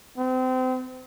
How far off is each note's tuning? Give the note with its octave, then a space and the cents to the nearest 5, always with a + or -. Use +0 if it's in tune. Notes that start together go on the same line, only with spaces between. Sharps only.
C4 -30